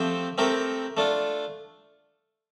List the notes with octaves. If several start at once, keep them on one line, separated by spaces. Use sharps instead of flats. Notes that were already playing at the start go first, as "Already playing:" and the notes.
Already playing: F3 A3 C4 G4 C5
A3 C4 G4 A#4
A3 D4 F4